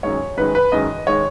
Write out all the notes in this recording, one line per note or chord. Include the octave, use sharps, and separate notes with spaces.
F#2 D#3 G#3 C#5
F#2 D#3 G#3 B4
B4
F#2 D#3 G#3 D#5
D#3 G#3 C#5